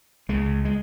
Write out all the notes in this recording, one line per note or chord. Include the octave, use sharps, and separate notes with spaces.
C#2 C#3 G#3
G#3